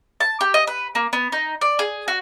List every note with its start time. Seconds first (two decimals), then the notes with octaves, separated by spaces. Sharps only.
0.20 A5
0.41 G4
0.54 D#5
0.67 B4
0.95 A#3
1.13 B3
1.32 D#4
1.61 D5
1.79 G#4
2.08 F#4